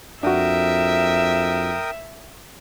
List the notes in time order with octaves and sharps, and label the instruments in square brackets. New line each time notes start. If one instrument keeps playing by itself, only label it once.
[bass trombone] F2 [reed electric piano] D4 F#4 [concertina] A#4 G5 D#6 [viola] E5